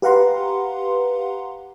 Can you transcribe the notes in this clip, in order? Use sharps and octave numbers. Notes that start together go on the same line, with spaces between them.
G4 B4 F5 F#5 A#5 C6